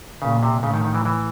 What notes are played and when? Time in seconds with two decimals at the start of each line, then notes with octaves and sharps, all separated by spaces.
0.22 A#2 C#3
0.43 C3
0.63 A2 C#3
0.74 D#3
0.85 D#3
0.95 E3
1.05 E3